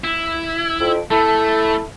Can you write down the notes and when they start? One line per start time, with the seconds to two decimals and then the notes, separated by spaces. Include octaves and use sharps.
0.04 E4
0.80 F2
1.11 A3 E4 A4